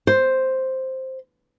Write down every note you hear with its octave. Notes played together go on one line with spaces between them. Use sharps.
C5